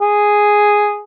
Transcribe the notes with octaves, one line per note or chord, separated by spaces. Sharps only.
G#4